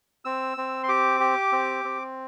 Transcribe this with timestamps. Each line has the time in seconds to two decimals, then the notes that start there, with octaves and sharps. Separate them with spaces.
0.25 C4 E6
0.57 C4
0.84 C6
0.89 G4 D6
1.20 G4
1.52 C4
1.84 C4